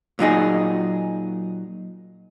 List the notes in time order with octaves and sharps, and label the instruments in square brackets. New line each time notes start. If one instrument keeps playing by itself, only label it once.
[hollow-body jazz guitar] A#2 F#3 D#4 G#4